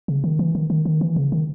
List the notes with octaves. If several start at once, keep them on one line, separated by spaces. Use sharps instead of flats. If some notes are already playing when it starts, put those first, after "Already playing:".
C#3
D#3
E3
D#3
D#3
D#3
E3
C#3
D#3